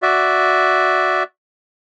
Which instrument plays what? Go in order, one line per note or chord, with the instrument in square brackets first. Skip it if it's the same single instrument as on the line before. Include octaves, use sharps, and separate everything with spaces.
[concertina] F#4 D5 E5